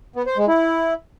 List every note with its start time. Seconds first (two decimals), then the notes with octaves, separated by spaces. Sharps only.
0.16 B3
0.27 C5
0.37 G#3
0.48 E4